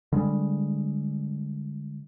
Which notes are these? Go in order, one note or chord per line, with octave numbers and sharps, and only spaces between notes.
D3 G3 G#3